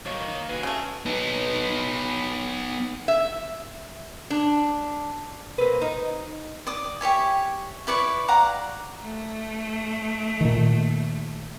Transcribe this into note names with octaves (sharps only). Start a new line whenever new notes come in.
D#3 F#3 A#3 D#4 C#5
D#4
G#3 F#4 B4 G#5
C#3 A3 C#4
B3 D#4
E5
D4
A#3 C4 B4
D#4
D5 D6 D#6
G4 C#5 E5 G#5
E4 B4 D5 C#6
D5 F5 F#5 A#5
A3
A#2 D#3